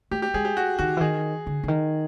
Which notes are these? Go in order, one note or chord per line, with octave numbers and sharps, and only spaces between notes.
A3 G4
G4
G#3 G#4
G4
F#4
D#3 F#4
E3
D#3 G#4
D3
D3
D#3